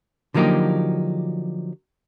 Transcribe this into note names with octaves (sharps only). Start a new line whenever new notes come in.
D3 F3 F#3 A#3 D#4 G4